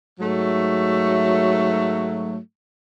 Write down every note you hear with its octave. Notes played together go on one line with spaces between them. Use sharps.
G#2 F#3 A3